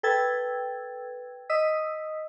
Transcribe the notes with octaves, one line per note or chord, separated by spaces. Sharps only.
A4 B4 G5 E6 G#6 A6
D#5 D#6 E6 B6